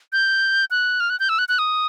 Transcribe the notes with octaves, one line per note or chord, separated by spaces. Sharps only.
G6
F#6
F6
F#6
G6
E6
F#6
F#6
D#6